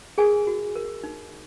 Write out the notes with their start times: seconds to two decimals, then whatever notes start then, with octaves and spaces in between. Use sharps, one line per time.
0.18 G#4 A#4 G#5
0.47 F#4
0.75 A#4
1.04 D#4